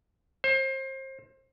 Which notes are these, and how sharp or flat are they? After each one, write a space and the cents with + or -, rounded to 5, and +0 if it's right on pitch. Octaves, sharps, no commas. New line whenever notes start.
C5 +30